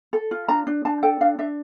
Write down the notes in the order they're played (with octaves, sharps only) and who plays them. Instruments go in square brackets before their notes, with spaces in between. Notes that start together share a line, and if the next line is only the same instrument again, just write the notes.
[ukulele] A4
F4
D4 A#5
D4
D4 A5
A4 G5
D4 F5
D4 E5